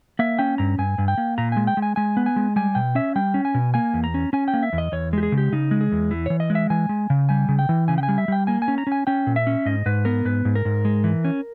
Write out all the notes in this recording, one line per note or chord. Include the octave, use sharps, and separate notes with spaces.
A#3 E5
C#4 G5
G2 A#5
G2 G#5
G2
G5
A#3
A#2 A#5
G#3 G#5
G5
G#3
G#5
G#3 G#5
B3
G#5
G#3
G3 G#5
B2 G5
C#4 E5
G3 G5
C#4
G#5
B2
A#3 G#5
E2
A#5
C#4
C#4 G#5
G5
A#3
E5
E2
D#5
E2 C#5
G#3 G4
G#4
C#3
G4
C#3 D#4
G#3
G#4
E2
E3
E3 C#5
D#5
G#3
E5
E3 G#5
G#3
C#3
G3 G#5
C#3
G5
E3
C#3 G#5
G5
G#5
G3
E5
G3 G5
A#3 G#5
G#5
C#4
A#5
C#4
G#5
C#4 G5
A#2
E5
C#4
G#2 D#5
G#2 B4
B3 A#4
G#2 B4
G#2
A#4
G#2
G#3
E3
C#4